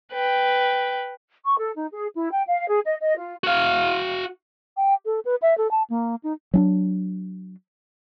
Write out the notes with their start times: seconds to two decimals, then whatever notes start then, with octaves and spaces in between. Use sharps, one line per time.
0.13 B4 G5
1.44 C#6
1.58 A4
1.75 D#4
1.93 G#4
2.14 E4
2.30 G5
2.46 F5
2.68 G#4
2.85 D#5
3.01 D#5
3.17 F4
3.44 F#4 F5
4.77 G5
5.06 A4
5.25 B4
5.42 E5
5.58 A4
5.71 A5
5.90 A#3
6.24 D#4
6.54 F#3 C#4 D4